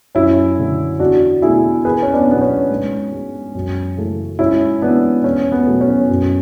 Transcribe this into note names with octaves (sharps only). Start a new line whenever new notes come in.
F#2 C#4 E4
D3 A3
E2 D4 F#4
B2 A3 E4 G#4
E2 G#4 B4
C#4
B3 D4
B2 F#3 B3
C#4
G#2
G#3
F#2
C#3 E3 A3
G#2 C#4 E4
E3 G#3 B3 D4
E2 C#4
B3
B2 F#3 A3
C#4
F#2